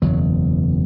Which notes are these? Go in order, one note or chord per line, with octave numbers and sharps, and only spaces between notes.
F#1 E2 B2 F#3